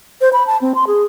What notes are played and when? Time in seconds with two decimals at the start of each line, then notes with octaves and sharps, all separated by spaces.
0.21 C5
0.33 B5
0.47 A5
0.61 C4
0.75 C6
0.87 G#4